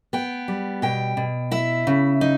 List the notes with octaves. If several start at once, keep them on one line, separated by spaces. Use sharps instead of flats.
B3 G5
G3
B2 G5
B2
E4 E5
C#3
D#4